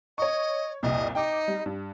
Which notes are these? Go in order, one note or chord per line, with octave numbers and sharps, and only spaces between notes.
C#5 D#5 C#6
C2 F2 A#2 D#5
D#4 G5 D6
G3
G2